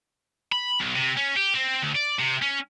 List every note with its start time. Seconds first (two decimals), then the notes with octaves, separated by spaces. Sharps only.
0.52 B5
0.80 B1
0.95 C3
1.17 C#4
1.36 G4
1.54 C4
1.83 D2
1.96 D5
2.20 C3
2.42 C#4